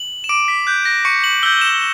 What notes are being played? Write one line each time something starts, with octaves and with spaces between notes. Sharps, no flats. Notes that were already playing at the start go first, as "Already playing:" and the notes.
Already playing: F#7
E7
D6 D7
B6
F#6 G6
A#6
C#6 C#7
F#7
E6 G6 G7
E7